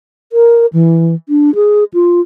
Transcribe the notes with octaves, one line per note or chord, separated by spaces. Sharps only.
A#4
E3
D4
G#4
F4